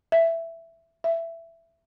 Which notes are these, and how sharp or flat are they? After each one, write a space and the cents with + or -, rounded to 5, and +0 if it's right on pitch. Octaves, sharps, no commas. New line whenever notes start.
E5 +10
E5 +15